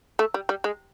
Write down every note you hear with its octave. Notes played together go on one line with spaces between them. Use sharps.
A3
G3
G3
G#3